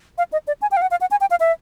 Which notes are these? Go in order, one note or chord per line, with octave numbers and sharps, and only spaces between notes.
F5
D#5
D5
G#5
G5
F5
F#5
F5
F#5
G#5
G5
F5
E5